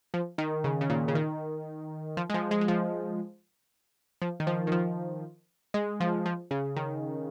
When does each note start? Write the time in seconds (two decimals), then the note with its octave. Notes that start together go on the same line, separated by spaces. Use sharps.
0.14 F3
0.38 D#3
0.64 C#3
0.81 C#3
0.90 A#2
1.08 C#3
1.15 D#3
2.17 F3
2.30 G#3
2.34 F3
2.51 G#3
2.61 G#3
2.68 F3
4.22 F3
4.40 D#3
4.47 F3
4.67 D#3
4.72 F3
5.74 G#3
6.00 F3
6.26 F3
6.51 C#3
6.76 D#3